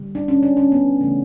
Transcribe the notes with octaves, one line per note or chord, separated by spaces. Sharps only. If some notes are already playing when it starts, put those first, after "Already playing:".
Already playing: D3 G3
D4
C#4
D4
C#4
B3
C#3 E3 A3